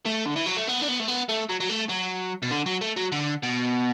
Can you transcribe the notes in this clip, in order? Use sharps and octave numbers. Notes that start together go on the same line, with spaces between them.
A3
D3
E3
F#3
A3
B3
D4
B3
A3
B3
A3
F#3
F#3
A3
F#3
B2
D3
F#3
A3
F#3
D3
B2